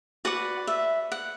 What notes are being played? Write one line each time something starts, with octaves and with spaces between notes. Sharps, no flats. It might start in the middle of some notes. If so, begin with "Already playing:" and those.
F#4 B4 D5 F#5
E5
F#5